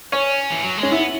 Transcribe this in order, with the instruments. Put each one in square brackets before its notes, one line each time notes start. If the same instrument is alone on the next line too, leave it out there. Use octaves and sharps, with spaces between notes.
[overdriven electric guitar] C#4 [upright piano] C#5
[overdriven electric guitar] E3
F#3
G#3
[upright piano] C#4
[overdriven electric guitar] B3 [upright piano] E4